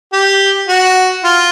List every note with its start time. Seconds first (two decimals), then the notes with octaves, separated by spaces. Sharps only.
0.12 G4
0.68 F#4
1.24 F4